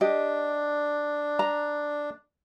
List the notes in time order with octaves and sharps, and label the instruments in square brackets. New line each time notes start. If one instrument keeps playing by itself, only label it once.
[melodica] D4 [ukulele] G4 D#5
[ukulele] A#5